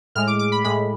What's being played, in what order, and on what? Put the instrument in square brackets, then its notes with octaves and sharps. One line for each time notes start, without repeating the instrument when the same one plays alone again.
[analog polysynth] A2 G#3 F6
D6
D6
B5
A2 G#3 B5